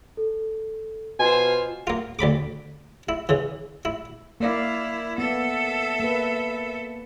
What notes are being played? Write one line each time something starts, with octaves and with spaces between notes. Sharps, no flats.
A4
B2 F4 C5 G#5 C6
A#3 F4
D2 D5 B5 D6
E4
C#3 E3
E4
A#3 E4 D5 F5
B3 A4 E5
A#3 B4